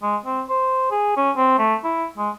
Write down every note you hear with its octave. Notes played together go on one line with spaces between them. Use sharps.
G#3
C4
C5
G#4
C#4
C4
A3
E4
G#3